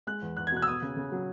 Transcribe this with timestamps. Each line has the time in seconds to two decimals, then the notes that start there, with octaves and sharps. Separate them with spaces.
0.07 G#3 F#6
0.22 E2
0.37 E2 F#6
0.47 G#6
0.52 B2 F#6
0.62 E6
0.67 B3 D#6
0.82 C#3
0.97 C#3
1.12 F#3